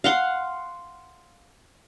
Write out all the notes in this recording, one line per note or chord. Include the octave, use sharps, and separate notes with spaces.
F5 F#5 C6